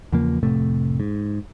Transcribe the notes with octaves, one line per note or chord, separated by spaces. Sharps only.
E2 C#3 F3 A#3
F1 A2 C3 A3
G#2